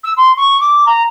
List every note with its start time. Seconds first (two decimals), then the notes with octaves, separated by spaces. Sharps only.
0.04 E6
0.17 C6
0.37 C#6
0.61 D6
0.87 A#5